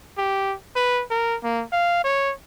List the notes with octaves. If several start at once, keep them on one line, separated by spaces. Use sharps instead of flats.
G4
B4
A#4
A#3
F5
C#5